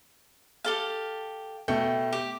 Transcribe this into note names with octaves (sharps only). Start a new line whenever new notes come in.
G4 A4 F5
B2 A3 G5
G4